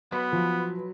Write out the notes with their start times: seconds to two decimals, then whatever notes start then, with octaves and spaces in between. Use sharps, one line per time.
0.12 F#3 B3 B4
0.32 F3